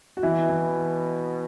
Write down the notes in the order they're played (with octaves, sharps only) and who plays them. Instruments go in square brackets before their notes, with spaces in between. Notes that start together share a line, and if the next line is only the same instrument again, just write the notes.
[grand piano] F#4
[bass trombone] B2 [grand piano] E3 E4
[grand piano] E3